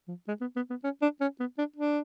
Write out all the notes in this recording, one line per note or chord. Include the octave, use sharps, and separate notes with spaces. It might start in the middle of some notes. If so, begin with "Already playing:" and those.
F3
G#3
B3
B3
B3
C#4
D4
C#4
B3
D4
D4